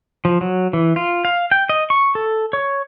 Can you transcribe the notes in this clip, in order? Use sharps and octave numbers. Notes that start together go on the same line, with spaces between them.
F3
F#3
E3
F4
F5
G5
D#5
C#6
A4
C#5